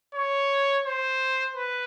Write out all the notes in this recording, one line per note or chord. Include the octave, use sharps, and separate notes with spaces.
C#5
C5
B4